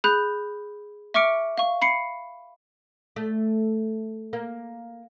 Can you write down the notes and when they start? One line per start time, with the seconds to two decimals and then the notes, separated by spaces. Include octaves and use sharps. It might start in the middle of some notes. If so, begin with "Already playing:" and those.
0.04 G#4 B5 F#6 G6
1.14 E5 C#6 D6 F6 C#7 D7
1.58 F5 C#6
1.82 B5 C7 C#7
3.16 A3
4.33 A#3